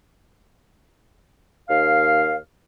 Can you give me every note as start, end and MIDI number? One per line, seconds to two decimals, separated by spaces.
1.70 2.37 39
1.70 2.37 77